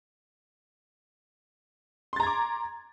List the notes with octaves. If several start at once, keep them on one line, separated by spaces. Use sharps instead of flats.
A#5 C6 D6 G#6 A6